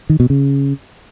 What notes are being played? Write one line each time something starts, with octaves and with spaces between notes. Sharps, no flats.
D#3
B2
C#3